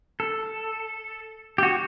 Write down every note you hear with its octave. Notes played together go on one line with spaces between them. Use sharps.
A4
G4
F#4